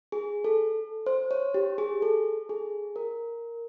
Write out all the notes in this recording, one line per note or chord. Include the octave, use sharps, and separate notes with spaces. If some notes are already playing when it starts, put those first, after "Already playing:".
G#4
A4
C5
C#5
G4
G#4
A4
G#4
A#4